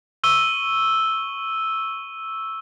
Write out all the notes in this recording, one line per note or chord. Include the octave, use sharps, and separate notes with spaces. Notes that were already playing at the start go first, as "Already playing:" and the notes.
C#6 E6 D#7 G7